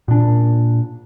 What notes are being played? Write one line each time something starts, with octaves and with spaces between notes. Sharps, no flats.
A#2 D4